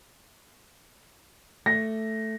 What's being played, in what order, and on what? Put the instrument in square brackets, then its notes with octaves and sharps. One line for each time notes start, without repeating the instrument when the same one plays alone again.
[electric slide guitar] A3 [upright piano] A#6